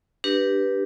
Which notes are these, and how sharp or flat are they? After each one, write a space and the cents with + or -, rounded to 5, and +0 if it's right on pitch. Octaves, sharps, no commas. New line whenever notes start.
D4 +0 G4 +0 B4 -10